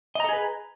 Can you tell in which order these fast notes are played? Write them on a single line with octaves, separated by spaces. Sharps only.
D#5 A#5 A4 G#4 B4